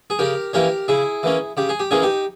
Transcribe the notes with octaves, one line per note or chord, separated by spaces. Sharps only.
G#4
C#3 G4 A#4
E3 A#3 C#4 G4 A#4
C#3 E4 G#4
E3 A#3 C#4
C#3 G4
G#4
G4
E3 A#3 C#4 G#4
D#4 G4